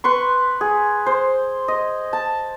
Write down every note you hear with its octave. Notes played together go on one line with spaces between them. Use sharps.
B4 C6 C#6
G#4
C5
D#5
A5